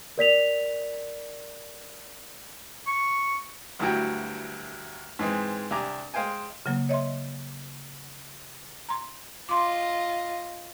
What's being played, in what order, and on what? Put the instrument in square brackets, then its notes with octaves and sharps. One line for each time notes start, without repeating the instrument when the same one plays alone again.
[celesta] A#4 D5 B6 F7
[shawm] C#6
[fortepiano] D2 G2 F#3 E4 F#4 G5
G#2 E3 G#3 C4
C2 D4 G4 G#5 A#5 D6
G#3 C5 F5 G5 G#5
[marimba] C#3 F#3 A#3
C#5 D#5 E5 C6
A#5 C6
[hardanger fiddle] F4 D#5 [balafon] C6 D6